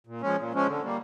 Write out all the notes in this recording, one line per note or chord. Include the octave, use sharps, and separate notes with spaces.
A#2
F3 G#3 C#4
A#2
F3 G#3 C#4
D3
G3 A#3